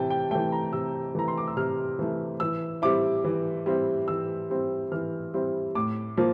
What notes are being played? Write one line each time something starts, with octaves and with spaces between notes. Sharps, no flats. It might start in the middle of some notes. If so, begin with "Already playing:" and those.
Already playing: C3 E3 G5 A5
G5
E3 A3 G5
A#5
C3 E6
E3 A3 A#5
C6
D6
E6
C3 F6
E3 A3
E3 E6
G3 C4 E4 D6
E3
G3 C4 E4
E3 E6
G3 C4 E4
E3 F6
G3 C4 E4
A2 D6
F3 A#3